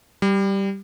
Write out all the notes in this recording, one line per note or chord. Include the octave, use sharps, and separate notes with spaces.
G3